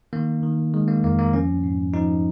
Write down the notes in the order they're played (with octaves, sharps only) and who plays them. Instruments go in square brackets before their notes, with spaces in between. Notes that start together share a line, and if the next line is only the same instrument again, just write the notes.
[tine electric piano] D#3 A#3
D#3
D#3 G#3
A#3
F2 A#3
A#3
F3 C#4
G#2
F3 D#4